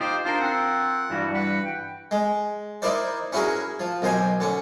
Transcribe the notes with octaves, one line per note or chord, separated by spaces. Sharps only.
D#4 F4 G4 C5
D4 F4 A#4 C5
C4 F#5
G2 E3 G3 F#4
B4 F#5
G5
G#3
D#4 E4 A#4 C5 D5
C#4 E4 F#4 G#4 A#4
F3
B1 D#3 C5 G#5
D3 C#4